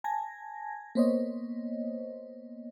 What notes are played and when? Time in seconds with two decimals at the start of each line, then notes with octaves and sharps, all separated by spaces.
0.04 G#5 A5 G#6 A#6
0.95 A#3 B3 C5 C#5 D#5